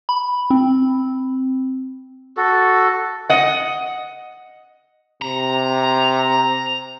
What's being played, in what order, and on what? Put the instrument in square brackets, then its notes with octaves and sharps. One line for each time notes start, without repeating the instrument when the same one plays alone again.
[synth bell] B5
C4
[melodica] F#4 A4
[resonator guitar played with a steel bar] D#5 F#5
[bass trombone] C3 [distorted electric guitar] A#5